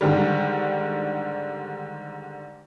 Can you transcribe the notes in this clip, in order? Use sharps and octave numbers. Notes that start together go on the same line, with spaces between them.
G#2 D3 D#3 G3